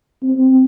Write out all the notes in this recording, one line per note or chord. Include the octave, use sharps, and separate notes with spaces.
C4